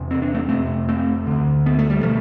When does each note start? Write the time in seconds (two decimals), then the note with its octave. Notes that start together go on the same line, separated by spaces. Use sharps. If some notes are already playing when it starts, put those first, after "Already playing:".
Already playing: E2 C3
0.11 C4
0.22 D4
0.34 A3 C4
0.49 F2 C3 A3 C4
0.89 A3 C4
1.27 D2 D3
1.66 B3
1.79 A3
1.90 G3
2.03 B2 F3 A3